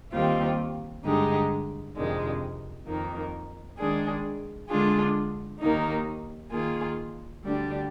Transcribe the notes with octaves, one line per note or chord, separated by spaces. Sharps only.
D#2 D#3 G3 C4 F4
G2 D3 G#3 D#4 G4
F2 C3 D#3 G#3 D4
F2 D#3 A#3 D#4
D#3 G#3 D4 G#4
D3 G#3 D4 F4 G#4
D#2 D#3 A#3 D#4
D#3 A#3 F4 G#4
D2 D3 G3 D4 G4